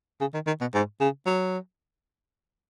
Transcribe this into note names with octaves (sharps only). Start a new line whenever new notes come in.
C#3
D#3
D#3
B2
G#2
C#3
F#3